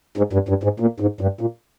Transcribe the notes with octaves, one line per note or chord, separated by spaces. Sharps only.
G#2
G2
G2
G#2
A#2
G#2
G2
A#2